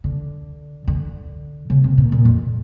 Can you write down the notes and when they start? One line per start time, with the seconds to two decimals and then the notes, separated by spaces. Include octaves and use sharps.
0.04 D3
0.87 D3
1.70 C#3
1.84 C3
1.98 A#2
2.12 A#2
2.25 F2